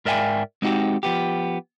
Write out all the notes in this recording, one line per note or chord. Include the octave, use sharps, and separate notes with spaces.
G#2 A#4 D5 E5 G5 G#5
G#3 C4 D#4 F#4 G4
F3 B3 G4